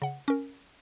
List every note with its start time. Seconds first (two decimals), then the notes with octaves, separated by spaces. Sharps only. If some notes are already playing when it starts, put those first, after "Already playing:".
0.02 C#3 F#5
0.28 C#4 A#4